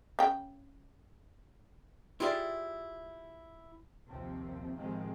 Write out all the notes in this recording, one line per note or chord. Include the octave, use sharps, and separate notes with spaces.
C#3 G5
E4 F4 G4 G#4 D5 E5
A#1 D#2 C3 F3 C4
A2 C3 D#3 F3 G#3 C4